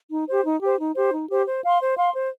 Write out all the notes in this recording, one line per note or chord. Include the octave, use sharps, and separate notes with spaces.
D#4
G4 C5
D#4
G4 C5
D#4
G4 C5
D#4
G4 C5
C5
F5 C6
C5
F5 C6
C5